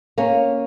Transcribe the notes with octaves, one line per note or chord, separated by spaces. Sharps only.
A#3 C#4